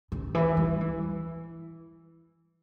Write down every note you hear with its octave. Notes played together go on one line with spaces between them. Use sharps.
C#3
E3
G3
E3